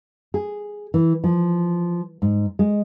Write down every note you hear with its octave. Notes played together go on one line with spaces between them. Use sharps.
G#4
E3
F3
G#2
G#3